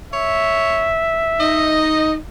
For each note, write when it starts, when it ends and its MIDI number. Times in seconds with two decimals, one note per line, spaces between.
0.13 0.93 73
0.13 1.90 76
1.40 2.16 63
1.40 2.14 75